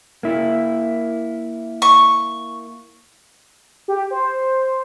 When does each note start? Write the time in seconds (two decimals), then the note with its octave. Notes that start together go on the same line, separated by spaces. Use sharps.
0.23 A#3 E4
1.82 C#6
3.88 G4
4.11 C5